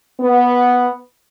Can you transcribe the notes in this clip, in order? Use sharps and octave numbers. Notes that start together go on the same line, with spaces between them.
B3